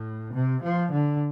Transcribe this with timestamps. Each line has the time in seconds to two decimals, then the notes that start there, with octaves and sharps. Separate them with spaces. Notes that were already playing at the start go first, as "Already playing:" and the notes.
Already playing: A2
0.33 C3
0.63 F3
0.92 D3